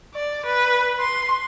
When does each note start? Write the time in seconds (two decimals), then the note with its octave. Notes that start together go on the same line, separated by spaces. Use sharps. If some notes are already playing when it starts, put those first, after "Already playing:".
0.14 D5
0.46 B4
1.00 C6